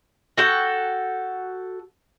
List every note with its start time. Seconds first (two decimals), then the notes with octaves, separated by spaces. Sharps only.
0.38 F#4 A4 G5